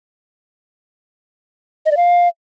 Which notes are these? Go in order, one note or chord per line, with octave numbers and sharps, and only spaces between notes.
D#5
D5
F5